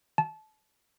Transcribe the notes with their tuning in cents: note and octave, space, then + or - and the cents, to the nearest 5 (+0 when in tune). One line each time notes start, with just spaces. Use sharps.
A5 -25